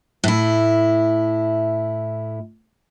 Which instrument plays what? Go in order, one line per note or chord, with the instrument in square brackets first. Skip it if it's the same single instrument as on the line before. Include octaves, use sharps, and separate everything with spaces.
[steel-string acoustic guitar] A2 E4